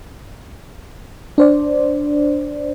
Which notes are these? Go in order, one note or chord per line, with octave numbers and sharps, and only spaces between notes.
D4 C5 D5